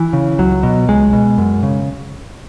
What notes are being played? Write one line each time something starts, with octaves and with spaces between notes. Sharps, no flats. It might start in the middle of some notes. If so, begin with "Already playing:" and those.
Already playing: E3
C#3
C#2 F#3
B2
C#2 G#3
B2
F#2
C#3